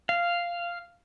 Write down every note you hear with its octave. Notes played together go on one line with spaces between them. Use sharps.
F5